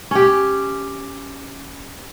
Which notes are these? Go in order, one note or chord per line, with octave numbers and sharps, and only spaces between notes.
C#4 G4